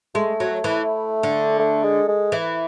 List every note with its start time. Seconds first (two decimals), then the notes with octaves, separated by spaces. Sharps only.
0.15 G#3 A3
0.40 F#3
0.64 E3
1.23 D3
1.59 A3
1.84 G#3
2.08 G#3
2.32 E3